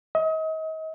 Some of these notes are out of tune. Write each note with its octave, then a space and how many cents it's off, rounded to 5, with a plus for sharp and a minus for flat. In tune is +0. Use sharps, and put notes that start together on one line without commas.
D#5 +35